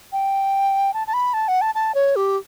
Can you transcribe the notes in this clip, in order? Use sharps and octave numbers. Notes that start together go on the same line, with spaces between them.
G5
A5
A5
B5
A5
F#5
A5
A5
C#5
G4